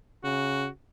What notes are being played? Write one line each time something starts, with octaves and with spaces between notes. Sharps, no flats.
C#3 F#4